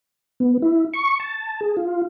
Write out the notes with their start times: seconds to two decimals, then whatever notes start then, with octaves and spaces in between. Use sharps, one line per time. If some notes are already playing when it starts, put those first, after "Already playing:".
0.40 B3
0.62 E4
0.93 C#6
1.20 A5
1.61 G#4
1.77 F4